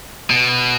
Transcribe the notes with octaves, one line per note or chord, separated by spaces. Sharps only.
B2